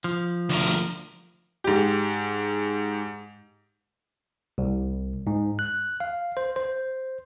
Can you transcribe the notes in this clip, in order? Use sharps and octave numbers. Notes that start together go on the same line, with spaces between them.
F3
D2 A#4
G#2 G4
C2
G#2
F#6
F5
C5
C5